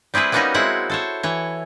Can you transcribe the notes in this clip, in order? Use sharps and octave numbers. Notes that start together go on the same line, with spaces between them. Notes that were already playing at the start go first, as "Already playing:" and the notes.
G3 C4 E4 G#4 B4
G3 A#3 B3 C#4 D#4 F#4
G#3 C4 E4 F#4 C#5 F#5
A4 C5 C#5
E3 C#5